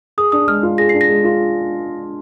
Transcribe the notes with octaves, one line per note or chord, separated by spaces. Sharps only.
G#4 D#6
D4 D#6
G#3 F6
F4
G#4 A#6
D4 C7
A#6
G#3
F4